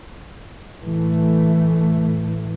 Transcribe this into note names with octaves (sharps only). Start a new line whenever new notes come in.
A2 E3 A3